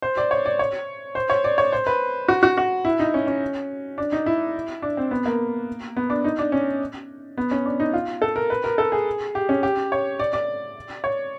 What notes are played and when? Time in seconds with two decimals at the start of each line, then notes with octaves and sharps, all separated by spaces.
0.02 C5
0.17 D5
0.31 C#5
0.45 D5
0.59 C#5
1.15 C5
1.30 C#5
1.44 D5
1.58 C#5
1.72 C5
1.87 B4
2.28 F#4
2.43 F#4
2.58 F#4
2.85 E4
3.00 D#4
3.14 C#4
3.27 C#4
3.98 D4
4.12 D#4
4.26 E4
4.82 D4
4.97 C4
5.11 B3
5.26 A#3
5.97 B3
6.10 D4
6.24 D#4
6.39 D4
6.52 C#4
7.38 B3
7.51 C#4
7.66 D4
7.80 D#4
7.93 F4
8.22 A4
8.36 A#4
8.50 B4
8.64 A#4
8.78 A4
8.92 G#4
9.35 G4
9.49 C#4
9.63 G4
9.92 C#5
10.19 D5
10.33 D5
11.04 C#5